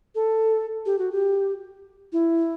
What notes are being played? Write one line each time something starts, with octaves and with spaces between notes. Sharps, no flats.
A4
G4
F#4
G4
E4